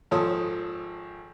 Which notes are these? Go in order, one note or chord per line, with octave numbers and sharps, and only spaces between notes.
G#1 F3 A4 C#5 D#6